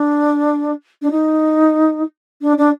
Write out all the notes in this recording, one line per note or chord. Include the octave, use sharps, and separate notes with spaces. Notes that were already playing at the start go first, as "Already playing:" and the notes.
Already playing: D4
D4
D#4
D4
D4